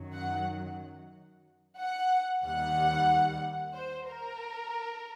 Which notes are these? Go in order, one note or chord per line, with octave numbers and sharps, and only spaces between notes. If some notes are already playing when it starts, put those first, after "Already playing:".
Already playing: F#2 D#3 F#3
F#5
F#5
D#2 D#3 G3 F#5
C5
A#4